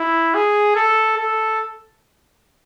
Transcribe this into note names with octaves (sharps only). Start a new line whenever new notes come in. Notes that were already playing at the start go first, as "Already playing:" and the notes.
Already playing: E4
G#4
A4
A4